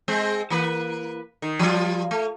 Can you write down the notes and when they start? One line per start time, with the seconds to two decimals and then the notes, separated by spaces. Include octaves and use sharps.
0.08 G#3 C4
0.50 E3 A#3 B4
1.42 D#3
1.59 F3 G3 F4
2.11 A3